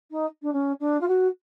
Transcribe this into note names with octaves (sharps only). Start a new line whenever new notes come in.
D#4
D4
C#4
D4
F4
F#4